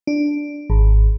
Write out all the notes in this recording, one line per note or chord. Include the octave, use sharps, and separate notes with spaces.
D4
G#1